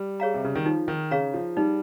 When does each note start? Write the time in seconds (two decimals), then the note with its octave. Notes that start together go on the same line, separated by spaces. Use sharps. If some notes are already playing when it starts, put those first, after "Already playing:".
Already playing: G3
0.20 G#4 C#5 F5 A#5
0.34 C3
0.45 C#3
0.55 D#3
0.65 F3 D#4
0.88 D#3
1.11 C#3 G#4 C#5 F5 A#5
1.34 F3
1.57 G3 D#4